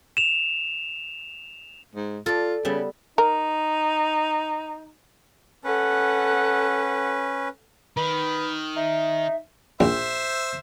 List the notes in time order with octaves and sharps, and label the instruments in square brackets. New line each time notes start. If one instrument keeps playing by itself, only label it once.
[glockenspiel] E7 F7
[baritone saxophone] G#2
[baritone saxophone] F4 [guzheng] A4 D5
[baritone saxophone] C#3 [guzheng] G3 B3 E5
[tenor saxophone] D#4 [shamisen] A#4
[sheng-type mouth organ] C#4 B4 [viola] A4 F#5
[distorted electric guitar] D#3 [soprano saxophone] B4
[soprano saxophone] D#4 [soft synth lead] E5
[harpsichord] A#1 [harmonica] C5 E5